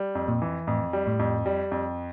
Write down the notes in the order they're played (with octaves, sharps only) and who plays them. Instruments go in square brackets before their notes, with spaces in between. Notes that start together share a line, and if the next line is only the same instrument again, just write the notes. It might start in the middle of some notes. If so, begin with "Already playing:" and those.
Already playing: [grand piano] G3
F2
[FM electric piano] A#2
[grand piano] E3
[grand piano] F2 [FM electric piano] A2
[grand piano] G3
[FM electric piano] A2
[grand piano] F2
G3
F2